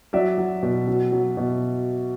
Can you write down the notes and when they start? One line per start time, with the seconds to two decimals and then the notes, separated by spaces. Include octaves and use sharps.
0.13 F#3 D5 E5
0.38 F#3
0.63 B2
0.88 F#3
1.12 F#3
1.37 B2